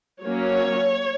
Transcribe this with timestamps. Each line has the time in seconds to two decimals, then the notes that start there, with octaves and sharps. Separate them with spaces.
0.23 F#3 A#3 C#4 C#5